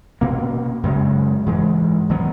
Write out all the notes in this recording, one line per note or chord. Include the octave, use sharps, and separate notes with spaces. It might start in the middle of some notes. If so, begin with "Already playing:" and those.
B2 A#3 C#4
F#2 C#3 G#3
G#2 E3 G#3
D#3 F#3 B3